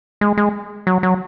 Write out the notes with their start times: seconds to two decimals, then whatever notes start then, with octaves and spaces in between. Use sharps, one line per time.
0.21 G#3
0.38 G#3
0.87 F#3
1.03 F#3